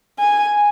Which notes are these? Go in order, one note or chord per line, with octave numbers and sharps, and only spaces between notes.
G#5